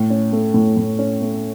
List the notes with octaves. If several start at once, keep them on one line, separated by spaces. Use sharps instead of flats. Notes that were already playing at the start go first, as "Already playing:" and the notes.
Already playing: A2
C#4
A3
A2
A2
C#4
A3